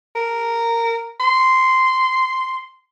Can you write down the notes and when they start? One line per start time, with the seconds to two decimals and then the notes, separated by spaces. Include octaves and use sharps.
0.15 A#4
1.20 C6